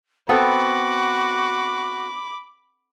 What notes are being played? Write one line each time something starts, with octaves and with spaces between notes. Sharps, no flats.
B3 C4 F#4 A4 B5 D6